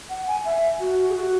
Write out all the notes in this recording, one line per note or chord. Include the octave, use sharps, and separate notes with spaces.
F#5
G#5
E5
F#4
G#4
F#4